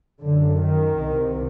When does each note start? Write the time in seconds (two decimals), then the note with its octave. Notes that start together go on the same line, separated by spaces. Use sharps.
0.21 F#2 D3
0.59 D#3
0.98 C2 C3